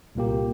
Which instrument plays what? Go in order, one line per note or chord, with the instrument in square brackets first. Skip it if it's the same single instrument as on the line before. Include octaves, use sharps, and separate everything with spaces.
[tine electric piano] C2 A#2 A#3 G4